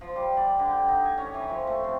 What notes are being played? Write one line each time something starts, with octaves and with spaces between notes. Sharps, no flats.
F3
G3
D5
D3
G5
D#4
G#5
C#4
E3
F3
A3
C3